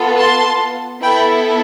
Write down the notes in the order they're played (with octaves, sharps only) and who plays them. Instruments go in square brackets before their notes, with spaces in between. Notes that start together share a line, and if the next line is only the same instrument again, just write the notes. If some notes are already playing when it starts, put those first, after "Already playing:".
Already playing: [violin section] B3 F4 A4
A5 C6
B3 E4 A4 G5 B5